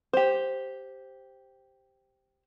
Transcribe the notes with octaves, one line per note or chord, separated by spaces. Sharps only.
G4 C5